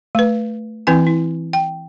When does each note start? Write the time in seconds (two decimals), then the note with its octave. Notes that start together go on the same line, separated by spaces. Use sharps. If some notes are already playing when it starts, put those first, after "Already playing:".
0.15 A3 B4
0.87 E3 C4 E4 G#5
1.07 E4
1.53 G5